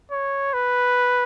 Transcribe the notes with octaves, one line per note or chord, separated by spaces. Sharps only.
C#5
B4